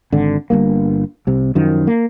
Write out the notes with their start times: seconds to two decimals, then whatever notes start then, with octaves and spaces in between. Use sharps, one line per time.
0.12 G#1 D3
0.50 G1 G2 A#3
1.27 C2 C3
1.55 F#2 D#3 F3
1.87 A#3